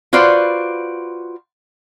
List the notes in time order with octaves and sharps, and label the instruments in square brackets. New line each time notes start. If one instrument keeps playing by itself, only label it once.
[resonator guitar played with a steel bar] F4 F#4 B4 C5 D5